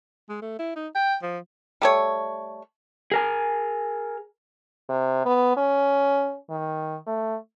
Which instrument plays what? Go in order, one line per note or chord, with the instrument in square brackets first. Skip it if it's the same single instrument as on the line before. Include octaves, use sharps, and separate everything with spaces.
[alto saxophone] G#3
A3
E4
D#4
G5
F3
[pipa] G3 A3 C#5
[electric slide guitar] G#4 A#4 G#5
[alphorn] C3
B3
C#4
D#3
A3